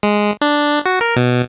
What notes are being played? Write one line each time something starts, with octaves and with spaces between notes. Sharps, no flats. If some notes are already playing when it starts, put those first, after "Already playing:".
G#3
D4
F#4
A#4
B2